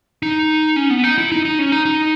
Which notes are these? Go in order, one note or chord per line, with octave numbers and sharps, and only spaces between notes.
D#4
C#4
B3
D#4
E4
D#4
D#4
C#4
D#4
D#4